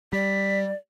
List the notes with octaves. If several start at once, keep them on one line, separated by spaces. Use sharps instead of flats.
G3 D5 B6